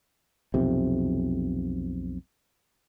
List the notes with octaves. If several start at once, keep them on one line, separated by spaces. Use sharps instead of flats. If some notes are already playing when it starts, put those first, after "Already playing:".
B1 F2 C3